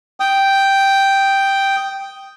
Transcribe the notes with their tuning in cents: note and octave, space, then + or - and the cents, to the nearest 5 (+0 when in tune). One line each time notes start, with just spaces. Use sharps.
G5 +0 D#6 +0